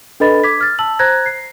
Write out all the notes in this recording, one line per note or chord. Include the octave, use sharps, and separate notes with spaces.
D4 A4 B4 D#5 B5 A6
D6 G#6 B6
F6 A6
A5 E6 F#7
C5 A#5 F#6 G#6 A#6
C7